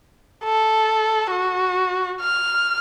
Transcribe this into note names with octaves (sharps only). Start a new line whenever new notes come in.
A4
F#4
F6